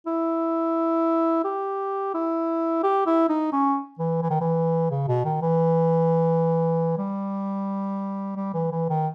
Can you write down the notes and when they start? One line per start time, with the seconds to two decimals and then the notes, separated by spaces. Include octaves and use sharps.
0.07 E4
1.44 G4
2.14 E4
2.84 G4
3.07 E4
3.29 D#4
3.53 C#4
3.99 E3
4.22 E3
4.30 D#3
4.41 E3
4.91 C#3
5.08 B2
5.25 D#3
5.42 E3
6.98 G3
8.37 G3
8.54 E3
8.72 E3
8.90 D#3